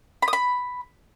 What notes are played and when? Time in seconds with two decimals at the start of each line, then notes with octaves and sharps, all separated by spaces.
0.22 B5
0.28 D#6
0.33 B5